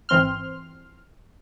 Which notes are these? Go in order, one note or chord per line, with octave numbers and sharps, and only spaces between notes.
G#1 E3 C4 C6 F6